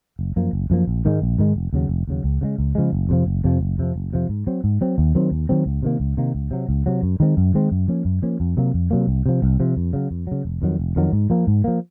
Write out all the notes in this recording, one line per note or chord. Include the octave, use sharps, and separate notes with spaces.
F#1
F#2 F3 A#3
F#1
F#2 F3 A#3
A#1
G#2 D#3 G#3
A#1
G#2 D#3 G#3
F1
D#2 C#3 F#3
F1
D#2 C#3 F#3
C#2
C#3 F3 G#3
C#2
C#3 F3 G#3
F#1
F2 C3 F3
F#1
F2 C3 F3
F#1
F2 C3 F3
F#1
F2 C3 F3
G#2
F#3 C4
G#2
F#3 C4
D#2
D#3 F#3 C4
D#2
D#3 F#3 C4
C#2
C3 D#3 A#3
C#2
C3 D#3 A#3
C#2
C3 F#3
C#2
C3 F#3
F#2
D#3 G#3 C4
F#2
D#3 G#3 C4
F#2
F3 A#3 C#4
F#2
F3 A#3 C#4
F2
C3 F#3 A#3
F2
C3 F#3 A#3
C2
C3 F3
C2
C3 F3
F2
C#3 F#3
F2
C#3 F#3
F1
F2 D#3 F#3
F1
F2 D#3 F#3
G#2
F3 A#3
G#2
F3 A#3